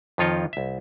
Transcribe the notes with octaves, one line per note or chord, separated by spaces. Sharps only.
F2 D#3 F3 F4 C#5 D#5
C2 E5